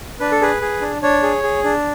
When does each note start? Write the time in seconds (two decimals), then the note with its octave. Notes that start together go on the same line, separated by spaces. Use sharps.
0.20 D4 B4
0.32 A4
0.41 G#4 B4
0.62 G#4
0.81 D4
1.02 D4 C#5
1.23 G#4
1.43 G#4
1.64 D4